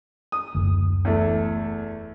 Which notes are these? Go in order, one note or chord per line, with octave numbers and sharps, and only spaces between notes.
D#6
F#1 D2
E2 A3